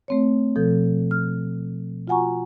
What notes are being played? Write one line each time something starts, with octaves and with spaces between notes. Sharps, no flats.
A3 C4 C#5
B2 F3 A4 G6
F6
F4 F#4 F#5 G#5 A#5 C#6